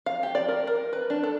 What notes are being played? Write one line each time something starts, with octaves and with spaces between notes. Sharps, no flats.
F5
G4
D5
A#4
A#4
B4
D4
A4